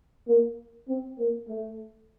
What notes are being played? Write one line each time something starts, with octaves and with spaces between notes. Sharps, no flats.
A#3
C4
A#3
A3